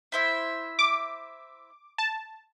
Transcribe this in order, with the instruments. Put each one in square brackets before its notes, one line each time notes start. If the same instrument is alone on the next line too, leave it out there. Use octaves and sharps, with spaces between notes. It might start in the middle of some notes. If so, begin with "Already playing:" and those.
[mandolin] E4 C5 E5
[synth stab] D6
A5